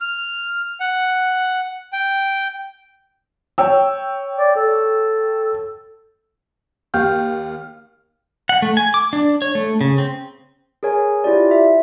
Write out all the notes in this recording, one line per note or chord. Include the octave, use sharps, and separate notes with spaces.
F6
F#5
G5
C#5 G5 E6
D5
A4
D#2 G4 F5 G5 G6
F#5
A3
G#5
D6
D4
C#5
A3
C#3
C4
G#4 A#4 C#5 G#5
E4 F4 G4 D5
E5